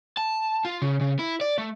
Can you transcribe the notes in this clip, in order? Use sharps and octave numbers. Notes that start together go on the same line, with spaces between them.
A5
F4
C#3
C#3
E4
D5
A3